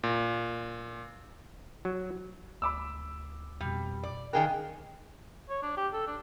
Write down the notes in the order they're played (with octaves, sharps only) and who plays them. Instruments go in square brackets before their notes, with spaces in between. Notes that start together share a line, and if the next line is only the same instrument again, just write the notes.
[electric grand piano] A#2
[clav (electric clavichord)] F#3
[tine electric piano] D2 [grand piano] B5 D6 E6
[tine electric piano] F2 B2 [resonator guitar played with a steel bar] G3
[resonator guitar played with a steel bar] D5
[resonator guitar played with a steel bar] D#3 G#4 A#4 [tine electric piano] D#5 F5 F#6 [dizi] G5
[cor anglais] C#5
D4
G4
A4
D4